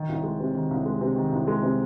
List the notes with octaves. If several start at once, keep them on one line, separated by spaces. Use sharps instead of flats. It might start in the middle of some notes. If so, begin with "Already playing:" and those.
Already playing: D#3
C2
G#3
C3
D#3
C2
G#3
C3
D#3
C2
G#3
C3